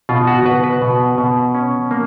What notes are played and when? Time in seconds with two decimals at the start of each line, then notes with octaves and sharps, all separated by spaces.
0.09 B2 F4
0.27 F#4
0.45 B2 B4
0.64 B4
0.82 B2
1.18 B2
1.55 C#4
1.91 A#3